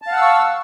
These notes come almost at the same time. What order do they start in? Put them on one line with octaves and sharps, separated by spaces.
A5 F5 F#5 E6 C#6